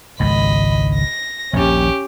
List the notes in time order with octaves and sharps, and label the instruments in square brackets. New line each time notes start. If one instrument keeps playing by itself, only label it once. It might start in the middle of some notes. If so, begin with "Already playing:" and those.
[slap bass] G#1 C#2 G#2 [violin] D#5 B5
[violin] A#6
[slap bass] A#1 D#2 [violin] C#4 G4